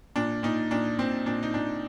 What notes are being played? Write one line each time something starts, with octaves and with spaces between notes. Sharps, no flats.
A#2 D4
A#2 D#4
A#2 D4
A#2 C4
A#2 D4
D#4
A#2 D4